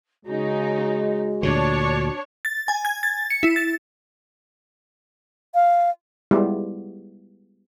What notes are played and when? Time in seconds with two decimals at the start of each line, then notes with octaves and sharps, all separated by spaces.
0.25 C#3 G#3 D#4 F#4
1.43 D2 A#2 D3 D4 C#5
2.45 A6
2.68 G#5
2.85 G#6
3.03 A6
3.30 C#7
3.43 E4
3.56 A6
5.55 F5
6.31 G3 G#3 B3 E4 F4 G4